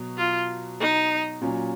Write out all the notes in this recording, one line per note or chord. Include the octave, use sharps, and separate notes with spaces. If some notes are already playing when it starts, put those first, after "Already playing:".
Already playing: B2 F#3
F4
D#4
A#2 F#3 C#4